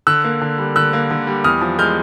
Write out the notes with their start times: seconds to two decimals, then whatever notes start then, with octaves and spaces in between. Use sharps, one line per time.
0.07 D3 E6 F#6
0.24 A#3
0.41 D3
0.58 G3
0.76 D3 E6 F#6
0.93 A#3
1.11 D3
1.27 G3
1.44 E2 D#6 F6
1.61 F3
1.78 G#3 F6 G6